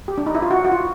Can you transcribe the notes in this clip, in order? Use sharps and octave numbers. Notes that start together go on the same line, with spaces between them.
G4
D4
D#4
E4
F4
F#4
F#4
F4